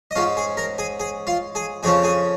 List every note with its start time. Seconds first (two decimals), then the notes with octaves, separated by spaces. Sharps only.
0.11 D#5
0.16 G#2 G#3 C#4 F4 F5
0.37 G#4 G#5
0.57 A#4 A#5
0.78 G#4 G#5
1.00 G#4 G#5
1.27 F4 F5
1.55 G#4 G#5
1.83 F2 C#3 F3 C#4 G#4 G#5
2.03 G#4 G#5